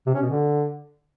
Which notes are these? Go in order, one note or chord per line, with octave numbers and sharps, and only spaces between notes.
C3
C#4
B2
D3